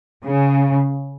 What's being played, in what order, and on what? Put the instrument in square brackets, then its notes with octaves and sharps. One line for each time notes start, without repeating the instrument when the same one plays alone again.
[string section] C#3